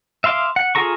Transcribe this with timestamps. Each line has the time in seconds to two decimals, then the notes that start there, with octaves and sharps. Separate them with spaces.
0.24 E5 F5 C6 D6
0.56 F#5
0.75 F4 G#4 A4 A#5 C#6